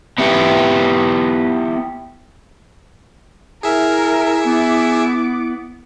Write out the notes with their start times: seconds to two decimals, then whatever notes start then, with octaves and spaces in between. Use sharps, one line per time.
0.18 B3 E4 G4
3.63 E4 G#4 A#4 E5
4.44 B3 D6